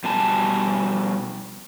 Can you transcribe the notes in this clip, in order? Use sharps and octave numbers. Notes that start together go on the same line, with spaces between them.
B2 G3 G#5 A5